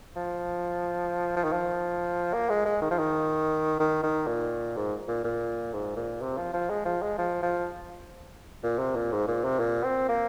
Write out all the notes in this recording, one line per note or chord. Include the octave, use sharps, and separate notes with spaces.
F3
F3
D#3
F3
A#3
G#3
G#3
D#3
F3
D#3
D#3
D#3
A#2
G#2
A#2
A#2
G#2
A#2
C3
F3
F3
G#3
F3
G#3
F3
F3
A#2
C3
A#2
G#2
A#2
C3
A#2
C4
A#3